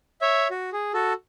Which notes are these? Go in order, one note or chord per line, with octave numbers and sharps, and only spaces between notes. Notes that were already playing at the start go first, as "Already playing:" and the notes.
C#5 E5
F#4
G#4
F#4 A4